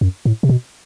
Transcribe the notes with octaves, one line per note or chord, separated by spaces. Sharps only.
F#2
A2
C3
B2